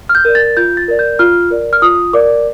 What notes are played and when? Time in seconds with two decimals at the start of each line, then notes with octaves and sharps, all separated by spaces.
0.09 F6
0.15 G6
0.25 A#4 D5
0.35 A6
0.57 F4 G6
0.77 A6
0.88 A#4 D5
0.99 G6
1.19 F4 F6
1.51 A#4 D5
1.73 F6
1.82 F4 D#6
2.13 A#4 D5 D6